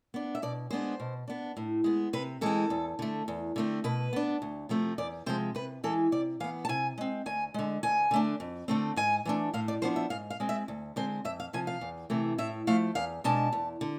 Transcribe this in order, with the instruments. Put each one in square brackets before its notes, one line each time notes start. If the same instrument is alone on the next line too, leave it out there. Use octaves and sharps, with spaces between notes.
[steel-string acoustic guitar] B3 D4
E5
B2 D5
G#3 B3 D4 C5
B2
B3 D4
A2
G#3 B3
C3 B4
E3 G#3 C4 A4
E2
D3 A3
E2
D3 A3 C4
B2 B4
B3 D4
D2
C3 F3 A3 C4
E2 D5
C3 F3 G#3 C5
C3 B4
E3 G#3 A4
C3 D5
E3 F5
B3
A5
C3 G#5
G#3 C4
D2 G#5
D3 G#3
D2 G#5
D3 A3 D4
F2
D3 A3 C4
G#2 G#5
E3 A3 D4
A2 F5
D5
F3 B3 D4 C5
E5
G#2 F5
F5
G#3 C4
E5
D2
D3 G#3 C4 C5
F2 E5
F5
C3 F3 G#5
F5
E2
C3 E3 A3
A2 E5
F3 A3 F5
E2 F5
B2 G#3 D4 A5
E2
D3